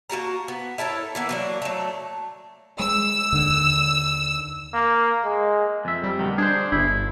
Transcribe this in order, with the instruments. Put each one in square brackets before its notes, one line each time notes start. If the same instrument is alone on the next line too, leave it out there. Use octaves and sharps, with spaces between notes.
[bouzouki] A#3 F#4 A5 A#5
B3
E4 A4 A#4 C#5
E3 A#3 B3
F#3 A#3 D4
F#3 A3
[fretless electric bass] G#3 [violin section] E6
[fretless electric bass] D#2 D3
[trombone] A#3
G#3
[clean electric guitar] F2 E5
[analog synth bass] G3
[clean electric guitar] D2 B2 D#3
[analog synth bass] D4 [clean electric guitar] G#4 C5
[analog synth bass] G1 [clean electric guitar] E4